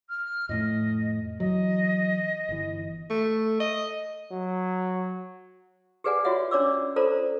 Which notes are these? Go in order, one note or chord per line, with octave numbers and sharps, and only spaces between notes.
F6
F2 A2 A3 D#5
E3 F#3 D#5
G1 E3
A3
D#5
F#3
G4 G#4 B4 D5 F#5 G#5
F4 F#4 C#5 E5 F#5
C#4 D4 C#5 D5 D6 E6
F4 A4 C5 D5 A#5